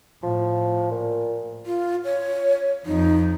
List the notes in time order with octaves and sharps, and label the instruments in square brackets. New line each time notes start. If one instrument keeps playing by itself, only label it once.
[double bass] A2 [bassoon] F3
[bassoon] A#2
[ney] F4
C#5
[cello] F2 [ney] D#4